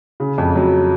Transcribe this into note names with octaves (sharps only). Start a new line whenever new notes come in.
C#3
F2
F#3